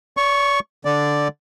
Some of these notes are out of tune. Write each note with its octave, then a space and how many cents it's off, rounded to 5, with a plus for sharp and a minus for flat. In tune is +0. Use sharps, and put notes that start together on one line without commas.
D5 -45 C#6 +0
D3 -5 D5 +0